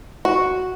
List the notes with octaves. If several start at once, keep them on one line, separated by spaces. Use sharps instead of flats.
F#4